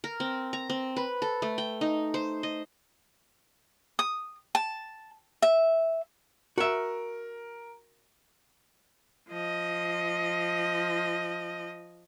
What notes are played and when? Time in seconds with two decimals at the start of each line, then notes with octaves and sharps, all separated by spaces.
0.04 A#4
0.20 C4
0.53 A#5
0.70 C4
0.96 B4
1.22 A4
1.42 A3
1.58 G5
1.81 D#4
2.14 C5
2.43 D#5
3.99 D#6
4.55 A5
5.42 E5
6.58 F#4 A#4 E5
9.29 F3 D#5